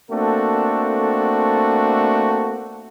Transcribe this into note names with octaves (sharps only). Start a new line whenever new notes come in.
A3 A#3 C4 D4 F#4 A4